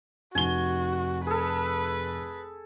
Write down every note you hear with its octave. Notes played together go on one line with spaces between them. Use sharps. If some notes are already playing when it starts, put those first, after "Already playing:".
F1 F#4 G#5 G7
G#4 A4 B4